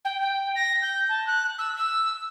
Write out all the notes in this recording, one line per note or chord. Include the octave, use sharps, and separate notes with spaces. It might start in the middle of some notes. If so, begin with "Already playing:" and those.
G5
G5
A#6
G6
A5
F#6
E6
E6